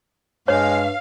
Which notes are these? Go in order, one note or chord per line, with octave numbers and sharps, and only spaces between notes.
G2 G#3 C#5 F5